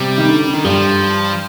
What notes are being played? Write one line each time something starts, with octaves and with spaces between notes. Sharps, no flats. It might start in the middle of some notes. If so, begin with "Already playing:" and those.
Already playing: C3 G3
D#3
D3
D3
D#3
G2 F3 G3